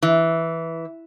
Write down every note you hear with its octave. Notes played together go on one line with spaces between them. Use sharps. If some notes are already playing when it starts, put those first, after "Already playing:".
E3